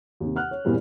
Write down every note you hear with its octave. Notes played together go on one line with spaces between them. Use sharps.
D#2 C3
F#5 F6 F#6
C#5
E2 A#2 E3 G3 A#3 C4